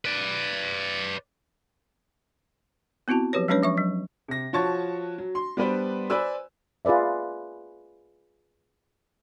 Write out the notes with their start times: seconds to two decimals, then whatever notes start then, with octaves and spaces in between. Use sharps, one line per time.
0.05 B4 D5
3.08 B3 C4 E4 F#4 A5
3.33 F3 F#3 G4 B4 C#5
3.48 F#3 G#3 C#4 D4 B4 C#5
3.62 F3 E5 C#6
3.77 F#3
4.28 C3 A#6
4.53 F3 F#4 C#5 A5 C#6 A6
5.18 F#3
5.35 C6
5.57 G3 B3 D4 B4 C5 D5
6.10 B4 C5 D5 G#5 E6
6.85 F4 G#4 B4 D5 E5